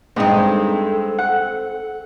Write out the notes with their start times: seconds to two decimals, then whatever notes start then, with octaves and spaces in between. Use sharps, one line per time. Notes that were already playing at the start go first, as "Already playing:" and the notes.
0.16 G2 G#3 C4 D#4 D#6
0.31 A4
1.19 F#5